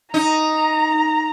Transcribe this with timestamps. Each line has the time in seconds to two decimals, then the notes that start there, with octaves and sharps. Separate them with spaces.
0.14 D#4 A#5